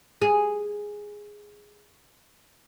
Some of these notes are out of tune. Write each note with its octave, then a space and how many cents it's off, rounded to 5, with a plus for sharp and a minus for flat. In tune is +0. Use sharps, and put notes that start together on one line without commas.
G#4 -5